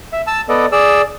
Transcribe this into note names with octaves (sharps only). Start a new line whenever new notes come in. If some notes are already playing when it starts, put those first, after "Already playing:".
E5
A5 E6
B3 A4 D5 D#5
G#4 D5 E6